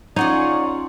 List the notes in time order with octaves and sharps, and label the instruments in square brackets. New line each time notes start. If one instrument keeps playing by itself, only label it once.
[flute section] C#4 F4 [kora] D#4 [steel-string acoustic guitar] G#4 F#5 A#5 [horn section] C#5 D5